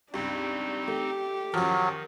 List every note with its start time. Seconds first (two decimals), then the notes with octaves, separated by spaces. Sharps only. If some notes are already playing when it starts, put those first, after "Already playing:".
0.14 C#2 G2 C4 D4 D#4
0.88 A3 G4
1.54 F#2 D#3 F3 F#3